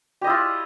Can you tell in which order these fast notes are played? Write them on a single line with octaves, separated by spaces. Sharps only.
G4 D#5 E4 F4